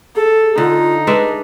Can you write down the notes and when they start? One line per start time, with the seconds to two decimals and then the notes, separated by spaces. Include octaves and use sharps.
0.16 G#4 A4
0.58 D3 D#4 F4
1.07 G#3 D4 B4 E5